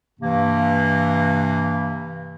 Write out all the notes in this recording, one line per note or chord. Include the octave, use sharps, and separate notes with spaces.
G2 C3 E3 A#3